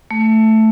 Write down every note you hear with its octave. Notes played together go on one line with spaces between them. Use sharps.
A3